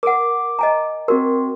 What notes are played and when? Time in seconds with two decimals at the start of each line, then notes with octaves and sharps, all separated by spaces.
0.03 A#4 F#5 D6 D7
0.59 D#5 G#5 A#5
1.08 C4 F#4 A#4 C6